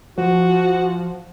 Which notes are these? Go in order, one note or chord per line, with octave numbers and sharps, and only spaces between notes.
F3 F#4